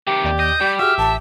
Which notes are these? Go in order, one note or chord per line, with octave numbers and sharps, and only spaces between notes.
C3 D#3 G4
D#2 D5 G5
D#5 G6
G3 G4 D5
F#4 G#4 E5 F6
A1 A5